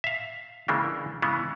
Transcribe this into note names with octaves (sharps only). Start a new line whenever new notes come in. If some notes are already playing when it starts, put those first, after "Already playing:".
E5 F5
C#3 E3 G#3 A#3 D4
C#3 E3 G#3 B3